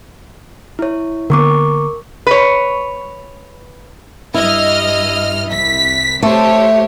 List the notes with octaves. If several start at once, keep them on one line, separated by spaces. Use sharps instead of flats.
E4 C#5
D3 A#3 B3 A#4 C#6 D6
B4 C#5
G2 E4 D#5 F6
C2 B6
A3 G4 C5 C#5